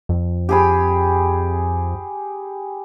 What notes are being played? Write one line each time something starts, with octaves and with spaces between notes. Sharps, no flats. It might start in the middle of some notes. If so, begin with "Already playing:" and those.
F2
G4 G#4 B5